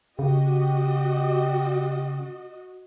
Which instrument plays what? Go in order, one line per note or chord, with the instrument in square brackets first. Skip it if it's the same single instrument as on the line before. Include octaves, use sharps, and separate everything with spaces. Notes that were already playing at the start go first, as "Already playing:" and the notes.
[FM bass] C#3 [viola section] F#4 D#5 [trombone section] G4